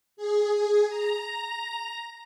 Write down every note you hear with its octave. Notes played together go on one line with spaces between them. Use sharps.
G#4
A#5